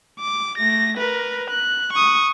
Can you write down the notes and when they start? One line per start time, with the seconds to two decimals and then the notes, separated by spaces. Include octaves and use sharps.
0.20 D6
0.58 A3 A#6
0.98 A#4 B4
1.50 F#6
1.93 C#6 D#6